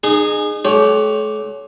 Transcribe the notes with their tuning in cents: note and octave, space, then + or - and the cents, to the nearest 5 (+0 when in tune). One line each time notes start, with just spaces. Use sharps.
D#4 -35 G#4 +0
A3 -45 G4 -5 C#5 +15